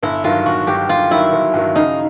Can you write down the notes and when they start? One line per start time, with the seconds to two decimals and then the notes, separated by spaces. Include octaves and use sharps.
0.03 G1 E4
0.24 G2 D#3 F#3 F4
0.46 G1 F#4
0.67 G2 D#3 F#3 G4
0.89 G1 F4
1.11 G2 D#3 F#3 E4
1.33 G1
1.54 G2 D#3 F#3
1.75 C#3 D#4